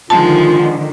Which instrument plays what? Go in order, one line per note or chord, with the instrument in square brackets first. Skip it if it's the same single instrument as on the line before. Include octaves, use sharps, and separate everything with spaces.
[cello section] D3 D#3 [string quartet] F3 G#3 [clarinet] F4 [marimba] A5